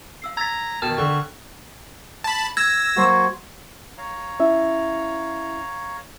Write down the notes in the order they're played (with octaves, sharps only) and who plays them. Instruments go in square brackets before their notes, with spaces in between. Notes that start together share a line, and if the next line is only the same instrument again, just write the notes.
[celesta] F5 E6 C7
[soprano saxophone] A#5 [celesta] E6 A6 [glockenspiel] G#6 B6
[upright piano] B2 D#3 [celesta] A#4 G5 E7 [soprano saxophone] A5 [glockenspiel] F6
[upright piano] D3 [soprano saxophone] C#6
[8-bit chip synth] A5 B5
[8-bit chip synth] E6 A#6 [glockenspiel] G#6
[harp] F#3 C5 [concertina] A#3 F#4
[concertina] C#5 F5 A#5
[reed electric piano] C#4 E4 E5